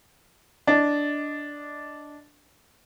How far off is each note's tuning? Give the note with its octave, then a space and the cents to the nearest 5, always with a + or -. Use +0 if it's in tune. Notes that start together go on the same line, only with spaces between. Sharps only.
D4 -5 D#5 +0